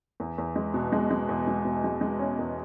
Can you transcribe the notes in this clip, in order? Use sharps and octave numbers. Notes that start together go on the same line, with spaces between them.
E2
E2
G#3
B2
G#3
G#3
E2
G#3
B2
G#3
G#3
C#4
E2